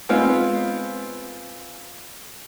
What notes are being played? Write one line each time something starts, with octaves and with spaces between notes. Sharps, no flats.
G#3 B3 C4 F4